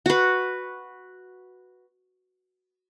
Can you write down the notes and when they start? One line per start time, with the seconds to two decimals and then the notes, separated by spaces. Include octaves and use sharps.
0.06 F#4 B4